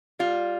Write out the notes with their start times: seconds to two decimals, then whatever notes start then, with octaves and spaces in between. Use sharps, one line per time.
0.19 G3 F4